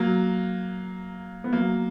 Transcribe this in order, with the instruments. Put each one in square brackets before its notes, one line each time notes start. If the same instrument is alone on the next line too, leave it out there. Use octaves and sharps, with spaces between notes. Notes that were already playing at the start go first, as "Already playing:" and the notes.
Already playing: [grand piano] F#3 A#3
B3
F#3 A#3